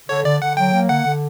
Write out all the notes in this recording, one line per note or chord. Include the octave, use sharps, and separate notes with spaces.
D3 C#5
D3 D5
D3 F#5
F#3 G5
A#3
D3 F#5
D3